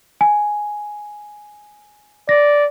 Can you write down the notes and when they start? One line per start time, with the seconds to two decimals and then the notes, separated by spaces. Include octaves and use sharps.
0.21 G#5
2.29 D5 A#6